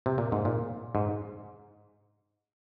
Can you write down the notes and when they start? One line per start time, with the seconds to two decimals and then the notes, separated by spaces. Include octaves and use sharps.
0.06 C3
0.18 A#2
0.32 G#2
0.45 A#2
0.95 G#2